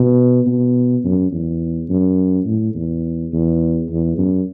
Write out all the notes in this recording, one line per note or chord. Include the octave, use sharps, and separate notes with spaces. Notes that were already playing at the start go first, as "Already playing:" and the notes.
Already playing: B2
B2
F#2
E2
F#2
A2
E2
E2
E2
F#2